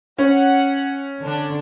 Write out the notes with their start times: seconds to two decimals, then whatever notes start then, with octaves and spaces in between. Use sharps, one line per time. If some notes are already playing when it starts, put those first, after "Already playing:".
0.18 C#4 F#5
1.22 D3 D4